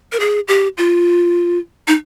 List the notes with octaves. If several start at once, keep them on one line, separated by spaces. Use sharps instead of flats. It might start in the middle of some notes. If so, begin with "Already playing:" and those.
A#4
G#4
G4
F4
D#4